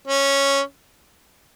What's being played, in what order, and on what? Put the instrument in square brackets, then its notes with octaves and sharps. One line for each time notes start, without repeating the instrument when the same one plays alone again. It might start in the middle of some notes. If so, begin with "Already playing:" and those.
[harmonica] C#4